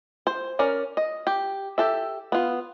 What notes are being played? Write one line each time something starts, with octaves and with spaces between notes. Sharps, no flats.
C5
C#4 A#4 D5
D#5
G4
G4 A4 E5
B3 F4